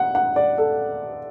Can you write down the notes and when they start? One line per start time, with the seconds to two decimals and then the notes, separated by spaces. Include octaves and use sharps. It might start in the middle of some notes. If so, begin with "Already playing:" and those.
Already playing: F#5
0.15 F#5
0.36 D5
0.58 A4